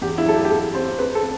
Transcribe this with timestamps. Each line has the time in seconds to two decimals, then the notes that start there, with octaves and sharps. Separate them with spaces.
0.01 E2 G4
0.18 E4
0.26 F#3 A4
0.34 G4
0.45 G4
0.50 E2 A4
0.75 C4 C5
0.99 C4 B4
1.15 A4
1.22 C4